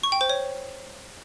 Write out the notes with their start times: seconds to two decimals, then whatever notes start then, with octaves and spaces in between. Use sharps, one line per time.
0.03 C#6
0.12 G5
0.21 C5
0.29 C#5